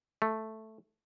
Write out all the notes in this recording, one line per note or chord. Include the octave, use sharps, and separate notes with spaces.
A3